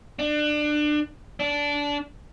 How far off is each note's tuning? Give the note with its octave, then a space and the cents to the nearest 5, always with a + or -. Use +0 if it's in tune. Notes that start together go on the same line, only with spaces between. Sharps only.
D4 +25
D4 -20